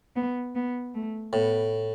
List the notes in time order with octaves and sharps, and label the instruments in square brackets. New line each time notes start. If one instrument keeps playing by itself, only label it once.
[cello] B3
B3
A3
[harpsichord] A2 [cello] B3